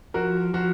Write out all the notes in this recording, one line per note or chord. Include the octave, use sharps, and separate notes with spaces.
F3 F#4 A#4
F3 F#4